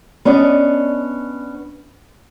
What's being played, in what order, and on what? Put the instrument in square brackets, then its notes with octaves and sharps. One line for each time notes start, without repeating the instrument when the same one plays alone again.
[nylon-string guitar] B3 C#4 D4 D5 D#5